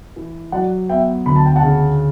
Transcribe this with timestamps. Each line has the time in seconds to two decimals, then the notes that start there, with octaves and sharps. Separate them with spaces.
0.16 E3
0.52 F#3 D5 F#5
0.89 B3 E5 G5
1.26 D2 B5
1.36 A5
1.46 G5
1.56 F#5 A5
1.63 C#3